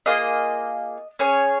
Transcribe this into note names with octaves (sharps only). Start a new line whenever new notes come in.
A#3 F4 G#4 D#5
C#4 G#4 C#5